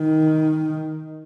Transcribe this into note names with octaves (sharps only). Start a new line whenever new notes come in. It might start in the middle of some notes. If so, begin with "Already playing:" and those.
Already playing: D#3